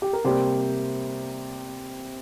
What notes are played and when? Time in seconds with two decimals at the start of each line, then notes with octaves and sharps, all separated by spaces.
0.02 G4
0.13 A#4
0.24 C3 G3 A#3 G4 C5